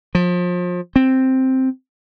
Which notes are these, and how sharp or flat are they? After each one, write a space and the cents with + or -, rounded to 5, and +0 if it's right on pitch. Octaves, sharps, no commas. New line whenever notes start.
F3 +30
C4 +0